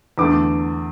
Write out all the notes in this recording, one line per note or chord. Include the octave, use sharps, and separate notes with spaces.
E2 D3 A3 D6